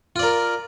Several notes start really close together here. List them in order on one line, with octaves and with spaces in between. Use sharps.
F4 D5 A#4